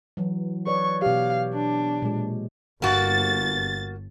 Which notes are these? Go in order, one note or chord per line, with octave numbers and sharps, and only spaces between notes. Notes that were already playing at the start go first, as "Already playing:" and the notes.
E3 F#3
B4 C#5 D5 C#6
B2 G4 F5
D4
A#2 G#3
G1 A#3 F#4 A6